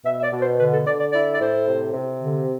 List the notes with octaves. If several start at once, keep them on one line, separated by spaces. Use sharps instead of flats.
B2 E5
E5
D5
B2
C5
D3 B4
A4
D3 D5
D5
E4 D5
D5
A2 C5
C3
C3
D3